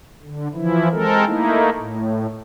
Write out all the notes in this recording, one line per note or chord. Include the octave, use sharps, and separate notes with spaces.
D3
E3 F3 E4
G#3 C4 A4 A#4
A3 A#3 D#4 E4
A2